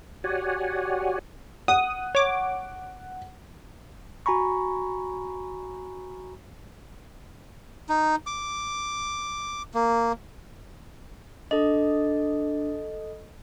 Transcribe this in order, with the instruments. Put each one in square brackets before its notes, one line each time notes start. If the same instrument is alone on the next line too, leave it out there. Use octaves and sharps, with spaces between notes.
[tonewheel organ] F#4 G4 C#5 D5 F#5 G#5
[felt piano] F#5 [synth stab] D#6
[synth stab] C#5 D6
[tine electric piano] F#4 G#5 A#5 B5 C#6
[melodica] D#4
D6
A#3
[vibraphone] D4 [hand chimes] A4 D#5